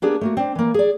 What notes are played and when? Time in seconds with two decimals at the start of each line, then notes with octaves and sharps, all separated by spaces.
0.02 A#3 B3 D4 G4 G#4
0.21 A3 A#3 F#4
0.37 C4 D4
0.55 E3 A#3
0.74 G#4 D5